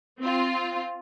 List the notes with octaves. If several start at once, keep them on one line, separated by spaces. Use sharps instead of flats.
C4 F4